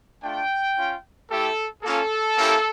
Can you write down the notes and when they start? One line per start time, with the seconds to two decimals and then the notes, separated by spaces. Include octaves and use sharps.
0.23 A3 D4 F4 G5
0.76 C#4 F4
1.30 A3 E4 G4 A4
1.83 A#3 C#4 F4 A4
2.36 A#3 C#4 E4 G4